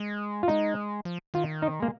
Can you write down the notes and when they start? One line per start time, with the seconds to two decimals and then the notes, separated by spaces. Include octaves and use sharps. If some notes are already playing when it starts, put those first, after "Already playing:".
Already playing: G#3
0.43 F4
0.48 G#3 D#4
1.05 F3
1.34 D#3 F4
1.62 D#4
1.80 G#3 A#3